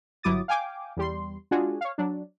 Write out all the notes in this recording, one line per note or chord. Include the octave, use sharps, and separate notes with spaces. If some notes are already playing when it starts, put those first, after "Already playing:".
G1 F#3 E4 D6 D#6 A6
F5 G5 G#5 D6
E2 G3 C6
G#3 D4 F4 F#4 G#4
C#5 F5
F#3 D4